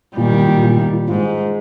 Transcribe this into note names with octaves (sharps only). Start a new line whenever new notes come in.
A#2 D#3 G3
A#2
A#2
A#2
A#2
F4
G#2 F4
G#3